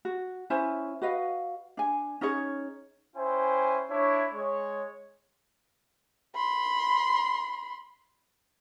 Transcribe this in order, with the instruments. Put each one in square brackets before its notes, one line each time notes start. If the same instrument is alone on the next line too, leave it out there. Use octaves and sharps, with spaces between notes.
[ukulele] F#4
C#4 E4 C5 G#5
F#4 B4 D#5 F5
D4 G#5
C#4 D#4 G#4 C#5
[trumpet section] C#4 E4 C5 G5 G#5
D4 E4 C#5
G#3 C#5
[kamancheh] B5 C6